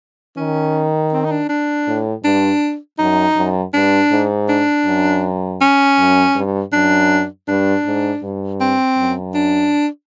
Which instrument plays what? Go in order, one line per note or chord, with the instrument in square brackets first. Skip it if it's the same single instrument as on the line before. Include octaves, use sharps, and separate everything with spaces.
[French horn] D#3 [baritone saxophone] C#4
[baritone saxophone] C4
D#4
D4
D4
[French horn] A2
[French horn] G2 [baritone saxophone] D4
[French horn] F#2 [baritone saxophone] D#4
[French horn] F#2
[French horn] G2 [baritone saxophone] D4
[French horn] G#2
[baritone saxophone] D4
[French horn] F#2
[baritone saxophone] C#4
[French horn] F#2
G2
[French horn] F#2 [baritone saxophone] D4
[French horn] G2 [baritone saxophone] D4
[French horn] G#2
G2
[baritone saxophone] C4
[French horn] F#2
[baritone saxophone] D4